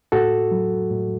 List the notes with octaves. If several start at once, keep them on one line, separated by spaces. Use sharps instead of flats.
A2 F#4 A4
F#3
A2